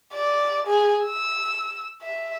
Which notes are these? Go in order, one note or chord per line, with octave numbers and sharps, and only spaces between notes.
D5
G#4
E6
E5